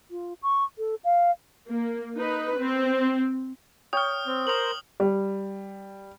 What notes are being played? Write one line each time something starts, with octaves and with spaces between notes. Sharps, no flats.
F4
C#6
A4
F5
A#3
D#4 B4
C4
C#5 G5 D#6 F6
C4
A#4 C5 D#6 F#7
G3